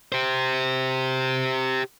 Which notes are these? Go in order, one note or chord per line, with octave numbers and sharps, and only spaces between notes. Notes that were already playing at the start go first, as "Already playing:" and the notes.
G4 C5